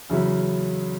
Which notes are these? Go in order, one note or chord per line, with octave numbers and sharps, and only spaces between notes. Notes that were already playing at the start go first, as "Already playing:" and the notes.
E2 C#3 F#3 C#4 E4